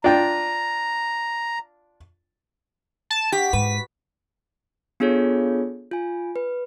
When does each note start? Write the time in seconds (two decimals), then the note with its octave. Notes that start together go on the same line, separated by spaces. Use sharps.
0.04 D4 F4 G5 A#5
3.10 A5
3.32 F#4 G4 D5 B6
3.53 G#2 B4 B6
5.00 B3 D4 F4 G#4 A4 C#5
5.91 F4 G#5
6.36 B4